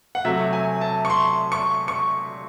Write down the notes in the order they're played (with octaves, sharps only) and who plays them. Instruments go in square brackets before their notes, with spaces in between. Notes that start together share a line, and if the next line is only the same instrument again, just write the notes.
[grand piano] F#5
C3 F#3 A3 E5
G#5
A5
C#6
C6
C#6
C#6